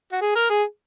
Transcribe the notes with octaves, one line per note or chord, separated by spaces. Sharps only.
F#4
G#4
A#4
G#4